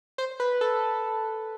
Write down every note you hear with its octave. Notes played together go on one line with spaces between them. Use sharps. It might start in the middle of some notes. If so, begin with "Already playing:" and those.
C5
B4
A4